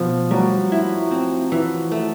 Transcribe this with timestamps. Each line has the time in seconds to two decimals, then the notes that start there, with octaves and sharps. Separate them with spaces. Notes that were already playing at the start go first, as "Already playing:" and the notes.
Already playing: B2 F3
0.31 F#3 G3
0.72 E4
1.11 C4
1.52 E3
1.92 A3